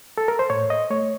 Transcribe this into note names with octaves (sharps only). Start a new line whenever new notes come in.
A4
A#4
C5
A2 C#5
D#5
A3 C#5